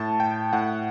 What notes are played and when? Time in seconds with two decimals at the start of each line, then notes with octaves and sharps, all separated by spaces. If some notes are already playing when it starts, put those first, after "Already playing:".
Already playing: A2 A5
0.20 G5
0.53 A2 F#5